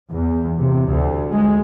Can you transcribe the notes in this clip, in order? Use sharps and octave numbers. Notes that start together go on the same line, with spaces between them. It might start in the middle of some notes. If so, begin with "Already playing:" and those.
E2
C3
D2
G#3